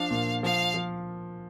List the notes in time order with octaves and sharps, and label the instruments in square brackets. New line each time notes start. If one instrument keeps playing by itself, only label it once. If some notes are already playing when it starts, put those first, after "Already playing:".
Already playing: [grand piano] F3 D4 [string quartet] F5
[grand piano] A#2
[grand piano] F3 [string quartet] F5
[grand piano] F3